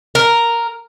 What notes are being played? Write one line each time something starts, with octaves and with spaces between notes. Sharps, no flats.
A#4